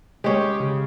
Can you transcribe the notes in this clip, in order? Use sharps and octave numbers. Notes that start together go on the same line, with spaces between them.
G#3 C#4 G4
C#3